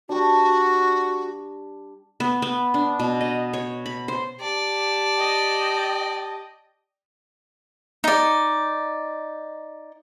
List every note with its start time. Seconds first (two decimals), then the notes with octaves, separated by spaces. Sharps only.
0.09 G3 D4 F#4
2.20 B3
2.42 B3
2.74 D4
2.99 B2
3.21 D#5
3.53 C#5
3.86 B5
4.08 C5
4.41 G4 D5 A5
5.18 D#5 G5
8.04 D#4 D5